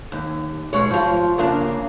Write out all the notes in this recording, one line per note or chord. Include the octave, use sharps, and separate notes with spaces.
D#2
B2 G#3 C#5
F3 F4
C#3 A#3 D4